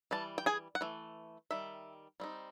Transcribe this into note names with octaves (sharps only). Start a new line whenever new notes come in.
E3 G3 A5
G5
G#4 G#5
F#5
E3 A3
D#3 G3 E5
G3 C4 D#4